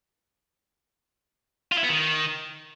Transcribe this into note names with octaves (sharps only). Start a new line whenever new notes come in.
F4
E4
B3
D#3